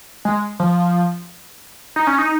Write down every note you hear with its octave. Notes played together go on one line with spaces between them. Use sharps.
G#3
F3
D#4
C#4
D#4